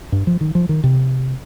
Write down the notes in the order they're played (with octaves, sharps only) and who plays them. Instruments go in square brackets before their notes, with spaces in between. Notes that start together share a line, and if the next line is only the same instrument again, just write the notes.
[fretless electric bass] G2
F3
D#3
F3
D#3
C3